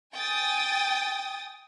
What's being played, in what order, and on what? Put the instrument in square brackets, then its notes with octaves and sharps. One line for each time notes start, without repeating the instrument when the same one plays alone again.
[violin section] G5 G#5 D#6 A6